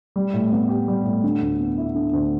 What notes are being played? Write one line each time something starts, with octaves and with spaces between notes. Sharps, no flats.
G3
A2
B3
G4
G3
A2
D3
D2
B3
E4
D3
D2